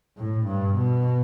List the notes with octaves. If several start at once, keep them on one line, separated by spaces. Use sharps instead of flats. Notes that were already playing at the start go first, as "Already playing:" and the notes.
A2
G2
B2